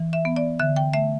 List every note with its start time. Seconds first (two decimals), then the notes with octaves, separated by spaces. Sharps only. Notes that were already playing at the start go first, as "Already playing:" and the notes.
Already playing: E3
0.13 E5
0.25 B3
0.36 D5
0.59 D3 E5
0.76 G5
0.94 A3 E5